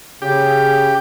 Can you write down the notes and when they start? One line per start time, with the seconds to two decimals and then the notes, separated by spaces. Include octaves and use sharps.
0.22 C#3 G4